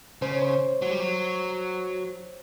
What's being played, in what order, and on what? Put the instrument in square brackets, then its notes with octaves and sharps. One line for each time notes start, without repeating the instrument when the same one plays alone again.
[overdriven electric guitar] C#3 [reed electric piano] C5
[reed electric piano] C#5
C5
[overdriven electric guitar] F#3
G3
F#3